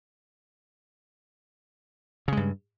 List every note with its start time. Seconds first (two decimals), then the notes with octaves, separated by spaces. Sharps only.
2.28 C#3
2.32 G#3
2.37 G2